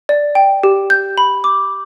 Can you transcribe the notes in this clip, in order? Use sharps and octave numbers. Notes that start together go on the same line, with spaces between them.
D5
G5
G4
G6
B5
D6